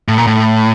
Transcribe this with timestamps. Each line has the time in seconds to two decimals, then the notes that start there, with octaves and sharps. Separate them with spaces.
0.08 A2
0.18 A#2
0.27 A2